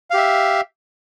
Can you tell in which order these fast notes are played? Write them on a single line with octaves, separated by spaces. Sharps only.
F5 G4 E5